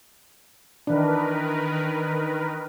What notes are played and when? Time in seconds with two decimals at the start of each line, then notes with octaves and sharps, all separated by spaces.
0.87 D#3 E3 D4 A#4 B4